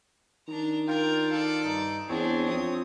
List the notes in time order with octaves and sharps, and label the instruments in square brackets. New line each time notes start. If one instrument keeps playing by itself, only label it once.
[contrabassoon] D#3 [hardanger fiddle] D4 A#5
[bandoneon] F4 G5 [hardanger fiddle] A#4 D5
[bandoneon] F4 F5 [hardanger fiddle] A4 D5
[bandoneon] G2 D#4
[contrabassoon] E2 [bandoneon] C4 C#5 [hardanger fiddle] D4 G#4
[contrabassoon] F2 [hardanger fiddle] D#6